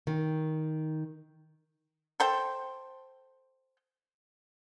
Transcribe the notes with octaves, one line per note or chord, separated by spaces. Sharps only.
D#3
A4 C5 G5